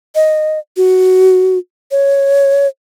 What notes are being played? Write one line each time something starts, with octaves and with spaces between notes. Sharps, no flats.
D#5
F#4
C#5